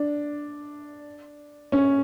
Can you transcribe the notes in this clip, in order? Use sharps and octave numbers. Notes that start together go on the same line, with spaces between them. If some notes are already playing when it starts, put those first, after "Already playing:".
Already playing: D4
C#4